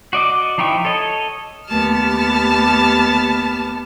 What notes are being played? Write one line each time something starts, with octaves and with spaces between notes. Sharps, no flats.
F#4 D5 D#5 D6
F3 D#4 E4 G5 C#6
A4 C#5 D#5
D#2 A3 B3 G4 A5 F6